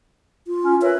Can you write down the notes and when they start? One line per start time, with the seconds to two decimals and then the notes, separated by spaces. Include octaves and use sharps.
0.47 F4
0.63 C#4
0.82 A#4 B4 C#5 E5